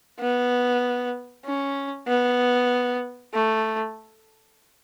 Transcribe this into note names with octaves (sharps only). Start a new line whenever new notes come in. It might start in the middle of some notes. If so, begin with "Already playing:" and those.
B3
C#4
B3
A3